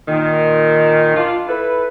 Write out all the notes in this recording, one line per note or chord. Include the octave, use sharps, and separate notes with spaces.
A#2 D#3
D4 F4
E4 A4 B4